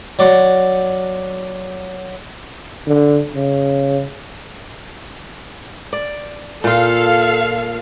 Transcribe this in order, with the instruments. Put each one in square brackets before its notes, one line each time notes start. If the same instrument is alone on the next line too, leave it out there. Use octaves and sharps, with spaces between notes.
[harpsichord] F#3 D5 F#5 C6
[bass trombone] D3
C#3
[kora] D5
[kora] A#2 F4 [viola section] A4 F5